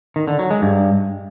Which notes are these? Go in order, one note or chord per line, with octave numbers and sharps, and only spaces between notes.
D#3
D3
F#3
G#3
G2